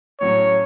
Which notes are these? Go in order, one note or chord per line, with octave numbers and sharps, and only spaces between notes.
A2 F#3 C#4 C#5